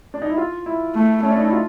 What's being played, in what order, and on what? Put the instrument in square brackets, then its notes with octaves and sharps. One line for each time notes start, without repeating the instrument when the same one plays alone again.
[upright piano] D4
D#4
E4
F4
E4
[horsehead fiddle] A3
[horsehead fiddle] A3 [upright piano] C#4
[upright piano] D4
D#4
E4
F4